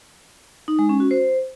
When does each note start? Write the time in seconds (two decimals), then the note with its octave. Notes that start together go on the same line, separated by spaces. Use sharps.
0.68 D#4
0.79 G#3
0.89 C#4
1.00 F#4
1.11 C5